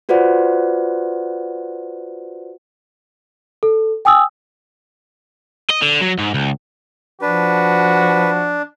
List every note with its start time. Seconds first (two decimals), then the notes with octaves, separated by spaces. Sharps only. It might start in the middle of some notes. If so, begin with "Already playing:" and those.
0.09 F4 F#4 B4 C5 D5 F#5
3.63 A4
4.05 G5 G#5 D#6 E6
5.70 D#5
5.82 D3
6.01 F#3
6.19 G#2
6.34 C#2
7.22 F3 D4 F#4 B4